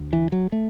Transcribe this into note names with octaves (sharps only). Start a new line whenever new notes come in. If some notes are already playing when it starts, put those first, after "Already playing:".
Already playing: D2
E3
F#3
A3